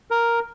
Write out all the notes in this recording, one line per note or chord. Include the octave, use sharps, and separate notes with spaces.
A#4